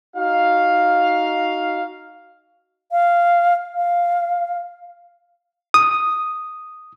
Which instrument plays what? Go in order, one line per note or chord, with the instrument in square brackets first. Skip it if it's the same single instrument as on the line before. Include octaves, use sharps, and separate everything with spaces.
[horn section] D#4 F#4 F5
[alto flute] F5
F5
[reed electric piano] D#6